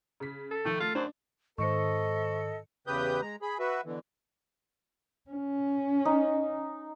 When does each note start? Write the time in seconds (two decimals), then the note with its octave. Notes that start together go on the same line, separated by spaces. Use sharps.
0.20 C#3 B6
0.51 A4
0.65 D#3 F3 A3
0.80 A3 F4
0.95 F#2 D4 C5
1.58 G#2 D#3 A4 C5 D#5 C#6 C#7
2.87 E2 C#3 G4 B4 D#6 G6
3.22 G#3 A#5
3.42 G#4 B5
3.59 F#4 B4 E5
3.85 B2 D3 E3
5.30 C#4
6.05 D#4